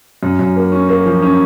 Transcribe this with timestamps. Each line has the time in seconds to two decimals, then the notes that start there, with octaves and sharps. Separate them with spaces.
0.23 F#2
0.39 F#2
0.56 A#3
0.72 C#4
0.89 A#3
1.05 F3
1.22 C#4